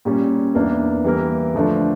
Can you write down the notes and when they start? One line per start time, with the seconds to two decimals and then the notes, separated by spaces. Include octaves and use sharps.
0.05 A#2 G3 C#4
0.55 E2 E3 A#3 D4
1.04 E3 G3 A#3 E4 A#4
1.54 D3 F3 A3 D4